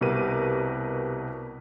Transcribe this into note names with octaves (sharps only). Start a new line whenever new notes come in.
C2 B2 G4 A#4 B4 D#7